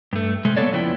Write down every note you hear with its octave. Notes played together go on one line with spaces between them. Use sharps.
G2 A3
C3 G#3 A3
A#3 B3 A4 C#5 D5
F2 C#3 F3 B3 E4 G5